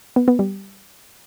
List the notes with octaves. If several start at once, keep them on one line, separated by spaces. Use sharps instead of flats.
B3
B3
G3